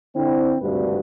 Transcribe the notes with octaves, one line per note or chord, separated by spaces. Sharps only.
D3 C4 E4
G#1 D2 G2 C3 F#4 B4